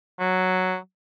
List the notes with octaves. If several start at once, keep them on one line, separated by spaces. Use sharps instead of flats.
F#3